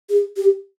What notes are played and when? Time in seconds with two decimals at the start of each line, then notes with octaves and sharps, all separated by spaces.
0.09 G#4
0.37 G4